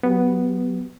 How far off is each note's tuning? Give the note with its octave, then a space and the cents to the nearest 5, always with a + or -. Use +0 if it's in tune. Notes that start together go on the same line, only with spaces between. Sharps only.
F#3 +0 B3 +0 G4 +0